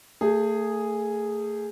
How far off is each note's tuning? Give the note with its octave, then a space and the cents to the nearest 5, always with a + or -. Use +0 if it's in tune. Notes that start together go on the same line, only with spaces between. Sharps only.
A3 +30 G#4 -5